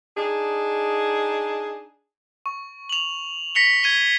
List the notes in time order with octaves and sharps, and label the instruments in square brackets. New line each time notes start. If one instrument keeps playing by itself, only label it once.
[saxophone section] D4 D#4 G#4
[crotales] C#6
F7 F#7
A#6 B6 C#7 F7 G7
G#6 D#7 G7